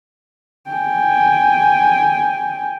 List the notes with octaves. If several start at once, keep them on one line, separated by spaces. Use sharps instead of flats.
G5 G#5